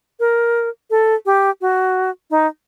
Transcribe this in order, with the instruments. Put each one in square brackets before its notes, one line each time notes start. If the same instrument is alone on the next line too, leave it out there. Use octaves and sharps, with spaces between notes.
[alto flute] A#4
A4
G4
F#4
D#4